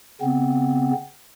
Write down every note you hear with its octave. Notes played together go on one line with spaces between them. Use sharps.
C#3 B3 C4